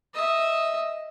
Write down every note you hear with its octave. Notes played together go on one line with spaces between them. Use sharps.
D#5 E5